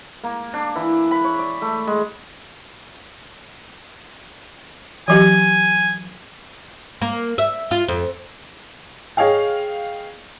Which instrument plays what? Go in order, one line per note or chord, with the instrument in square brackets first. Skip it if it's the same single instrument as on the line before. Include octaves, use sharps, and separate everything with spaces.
[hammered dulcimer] A#3
D4
E3
B5
C#5
D5
A3
G#3
[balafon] E3 F#3 G4 [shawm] G#5
[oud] A#3
E5
F4
F2
[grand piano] G#4 C#5 D#5 F5 G5